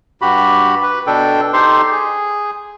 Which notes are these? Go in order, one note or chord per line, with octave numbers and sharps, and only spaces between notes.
G2 F#4 G4 B5
B4
B2 D4 A4 G5
D#4 G4 A4 C5 C6
G#4